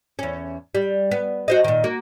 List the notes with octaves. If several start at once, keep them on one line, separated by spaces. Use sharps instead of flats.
E2 C#4
G3
B3
F#4 C5 D#5
A#2 D#3
A#3 F#4